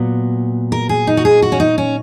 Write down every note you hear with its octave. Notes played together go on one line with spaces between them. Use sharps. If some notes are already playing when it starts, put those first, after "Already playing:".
Already playing: A#2 F#3 B3
A#4
G#4
D#4
F#4
G#4
F#4
C#4
D#4
C#4